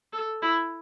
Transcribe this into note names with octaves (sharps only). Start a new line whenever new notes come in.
A4
E4